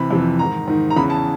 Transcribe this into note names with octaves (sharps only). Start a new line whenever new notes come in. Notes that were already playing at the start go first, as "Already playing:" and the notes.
Already playing: C3 E3 B5
F2 C3 E3
G#2 D#3 A#5
G#2 D#3
A#5
E2 C#3 E3 B5
A5